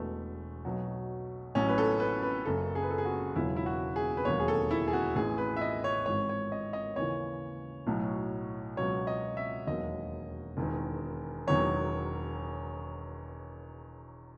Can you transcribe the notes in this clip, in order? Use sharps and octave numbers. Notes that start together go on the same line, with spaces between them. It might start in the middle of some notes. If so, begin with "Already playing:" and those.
Already playing: E1 E2 B2 A3
B1 B2 F#3
A1 A2 F#3 C#4
B4
A4
B4
B4
F#1 F#2 C#3 A4
G#4
B4
A4
G#4
F#4
E1 E2 C#3 F#3 E4
E4
F#4
G#4
B4
E1 D#2 D#3 F#3 C#5
G#4
A4
E4
G#4
F#4
A1 A2 E3 G#4
B4
E5
D#5
C#5
G#1 G#2 E3 C#5
C#5
D#5
D#5
D#2 C#3 E3 C#5
B1 A2 F#3
C#2 B2 F#3 C#5
D#5
E5
E1 D#2 D#3 F#3 D#5
E1 E2 D#3
E1 E2 D#3 F#3 C#5